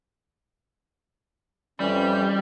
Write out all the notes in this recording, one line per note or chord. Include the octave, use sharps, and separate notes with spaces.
F2 E3 G3 C#4 G6